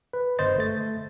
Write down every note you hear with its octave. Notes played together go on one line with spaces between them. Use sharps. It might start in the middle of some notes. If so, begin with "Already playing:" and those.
B4
G1 C5 D#5 A6
A3 A6